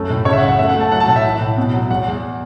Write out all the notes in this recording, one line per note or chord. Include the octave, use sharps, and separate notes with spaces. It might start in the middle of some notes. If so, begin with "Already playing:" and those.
Already playing: F#2 A3
A2
C#3 C#5
E5
F#5
F#2
F#5
A3 E5
F#5
A3
A5
F#3 F#5
A5
A2 F#5
E5
E3
A2
B2
F#3
E2 F#5
E2